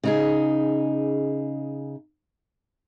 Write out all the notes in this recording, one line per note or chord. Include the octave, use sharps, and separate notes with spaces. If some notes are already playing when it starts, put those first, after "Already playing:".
C#3 D#4 G#4